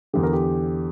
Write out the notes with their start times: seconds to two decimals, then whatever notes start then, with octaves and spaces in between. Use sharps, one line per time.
0.13 E2 D3 G4
0.23 A#4
0.33 G4